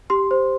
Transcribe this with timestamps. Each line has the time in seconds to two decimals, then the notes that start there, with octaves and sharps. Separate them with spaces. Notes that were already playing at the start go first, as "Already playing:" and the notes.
0.10 G4 C6
0.31 C5